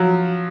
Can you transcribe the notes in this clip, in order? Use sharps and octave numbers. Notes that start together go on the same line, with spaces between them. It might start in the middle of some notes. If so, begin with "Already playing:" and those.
Already playing: F3 F#3